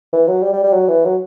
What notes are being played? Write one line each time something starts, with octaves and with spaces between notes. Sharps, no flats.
E3
F#3
G3
G3
G3
F#3
E3
F#3